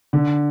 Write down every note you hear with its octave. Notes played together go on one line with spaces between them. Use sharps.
D3